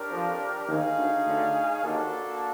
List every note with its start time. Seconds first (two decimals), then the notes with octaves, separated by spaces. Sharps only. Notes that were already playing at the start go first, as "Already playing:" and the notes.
Already playing: D4 G4 A#4 C#5
0.11 F2 F3
0.68 D#2 D#3 D#4 G#4 C#5 F5
0.96 D2 D3
1.25 D2 D3
1.83 D#2 D#3 A#3 D4 F#4 A4